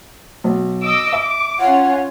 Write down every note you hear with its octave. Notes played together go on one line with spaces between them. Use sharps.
B1
D#5 D6 E6
E5 D6
C#4 F4 C#5 F#5